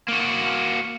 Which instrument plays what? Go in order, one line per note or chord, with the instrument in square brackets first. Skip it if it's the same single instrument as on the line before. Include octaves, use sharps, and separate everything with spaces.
[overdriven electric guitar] A#3 F#4